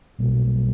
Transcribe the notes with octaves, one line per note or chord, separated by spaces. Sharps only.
B1 B2 G3 A#3